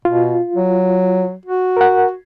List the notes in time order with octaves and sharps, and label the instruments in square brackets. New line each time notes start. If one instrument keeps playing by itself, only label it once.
[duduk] B2 [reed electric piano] F4
[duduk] F#3
F#4
[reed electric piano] A#4 F#5